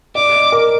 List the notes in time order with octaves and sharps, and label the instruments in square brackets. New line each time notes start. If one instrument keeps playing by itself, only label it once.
[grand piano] D5 [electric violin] D6
[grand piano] D#5
A#4